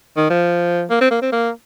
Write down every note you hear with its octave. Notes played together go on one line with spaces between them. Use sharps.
D#3
F3
A#3
C4
A#3
C4
A#3